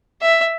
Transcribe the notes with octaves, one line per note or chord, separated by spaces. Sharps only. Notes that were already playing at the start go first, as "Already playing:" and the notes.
E5